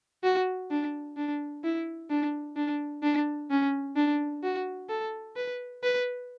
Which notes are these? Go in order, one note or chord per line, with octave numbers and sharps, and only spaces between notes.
F#4
D4
D4
E4
D4
D4
D4
C#4
D4
F#4
A4
B4
B4